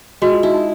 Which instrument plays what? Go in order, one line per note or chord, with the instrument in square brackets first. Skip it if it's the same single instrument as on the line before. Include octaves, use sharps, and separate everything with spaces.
[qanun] G#3 [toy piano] F#4
[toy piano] F4
[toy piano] D#4 [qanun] E4
[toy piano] D#4